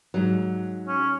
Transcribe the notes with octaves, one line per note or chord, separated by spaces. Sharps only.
G#2 F#3
C#4